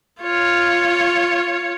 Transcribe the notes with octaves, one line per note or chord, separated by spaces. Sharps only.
F4 C#5